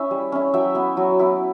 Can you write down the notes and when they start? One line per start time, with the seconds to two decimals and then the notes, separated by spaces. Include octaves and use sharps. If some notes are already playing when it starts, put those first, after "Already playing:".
Already playing: C#4 E4 E5
0.11 G3
0.32 C#4 E4
0.54 F#3 E5 G5
0.75 B3 E4
0.97 F#3
1.19 B3 E4